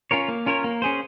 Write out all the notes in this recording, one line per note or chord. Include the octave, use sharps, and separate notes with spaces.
C#4 F4 A#4 C#5
A#3
C#4 F4 A#4 C#5
A#3
C#4 G#4 C5